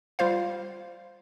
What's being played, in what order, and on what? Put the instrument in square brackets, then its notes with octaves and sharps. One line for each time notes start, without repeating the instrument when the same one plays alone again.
[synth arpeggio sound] G3 F4 C5 F5